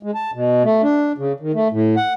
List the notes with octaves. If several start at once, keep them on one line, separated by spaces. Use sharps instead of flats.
G#3
A5
B2
A3
D4
C#3
D#3
A3
A2
F#5